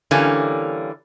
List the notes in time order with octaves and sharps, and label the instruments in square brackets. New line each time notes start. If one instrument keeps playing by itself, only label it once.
[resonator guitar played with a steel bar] D3 E3 G3 A#3 C#4